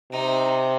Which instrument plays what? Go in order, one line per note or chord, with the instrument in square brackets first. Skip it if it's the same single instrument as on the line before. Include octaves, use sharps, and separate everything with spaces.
[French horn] C3 [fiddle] D#4